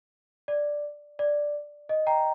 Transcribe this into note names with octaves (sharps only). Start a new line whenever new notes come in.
D5
D5
D#5
G5 A#5